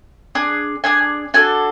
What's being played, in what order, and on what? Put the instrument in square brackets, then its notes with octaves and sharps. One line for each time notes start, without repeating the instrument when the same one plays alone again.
[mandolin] D4 G#4
D4 G#4 G#5
D4 F#4 A4 G#5